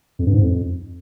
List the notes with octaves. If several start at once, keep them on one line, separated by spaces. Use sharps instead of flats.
F2
G2
G#2
F2